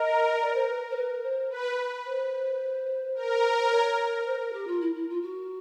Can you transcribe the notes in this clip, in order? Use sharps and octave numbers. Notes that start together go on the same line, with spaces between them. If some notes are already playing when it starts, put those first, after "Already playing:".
Already playing: A#4 D#5
D5
C5
B4
C5
B4
C5
B4
C5
A#4
C5
C#5
C5
A#4
G4
F4
E4
E4
F4
F#4